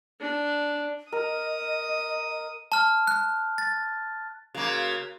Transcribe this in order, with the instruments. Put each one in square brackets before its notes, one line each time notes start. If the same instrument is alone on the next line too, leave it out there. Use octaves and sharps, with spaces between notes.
[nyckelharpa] D4
[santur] A#4 [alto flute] D#5 [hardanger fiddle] D#6
[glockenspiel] A5 F6
F#6
A6
[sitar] C#3 A#3 [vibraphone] F#4 A#4 C6